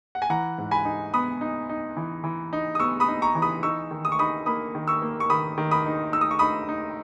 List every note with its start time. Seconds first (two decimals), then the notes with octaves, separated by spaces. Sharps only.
0.15 F#5
0.22 G#5
0.30 E3 F#5 A#5
0.58 G#2
0.71 G#5 B5
0.85 D#4
1.14 B3 B5 D#6
1.41 D#4
1.69 D#4
1.97 E3
2.24 E3
2.53 D#4
2.75 D#6
2.80 B3 C#6 E6
3.00 B5 D#6
3.08 D#4
3.22 A#5 C#6
3.35 E3
3.42 B5 D#6
3.63 D#4 C#6 E6
3.91 D#3
4.05 D#6
4.12 C#6
4.19 D#4 B5 D#6
4.46 A#3 B5 D#6
4.75 D#3
4.88 C#6 E6
5.02 A#3
5.20 C#6
5.30 D#3 B5 D#6
5.58 D#3
5.71 B5 D#6
5.86 D#4
6.13 D#4 E6
6.21 D#6
6.31 C#6
6.39 D#4 B5 D#6
6.69 D#4